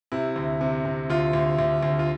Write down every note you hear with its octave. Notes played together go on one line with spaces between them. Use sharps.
C3 E4
D2
C3
C3
D2 F4
D2
D2
D2
F4